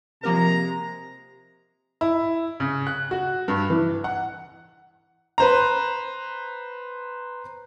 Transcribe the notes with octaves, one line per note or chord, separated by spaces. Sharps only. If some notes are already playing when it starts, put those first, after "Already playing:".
C3 F3 G#3 A#3 A#4 A#5
E4
C#3
F#6
F#4
G2
E3
F#5
B4 C5 A#5